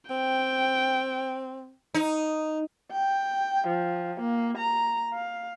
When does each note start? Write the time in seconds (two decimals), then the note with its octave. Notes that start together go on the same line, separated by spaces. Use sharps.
0.10 C4 G5
1.94 D#4
2.92 G5
3.67 F3
4.21 A#3
4.58 A#5
5.14 F5